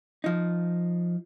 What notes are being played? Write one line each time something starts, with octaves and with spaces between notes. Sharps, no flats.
F3 D#4